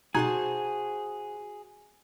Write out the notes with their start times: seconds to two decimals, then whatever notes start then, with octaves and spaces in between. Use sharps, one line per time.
0.15 B2 D#4 F#4 G#4 C5 A5 G#6